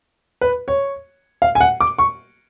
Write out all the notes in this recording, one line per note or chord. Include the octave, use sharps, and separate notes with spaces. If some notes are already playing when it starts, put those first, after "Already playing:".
B4
C#5
F5
G#5
F#5
D6
C#6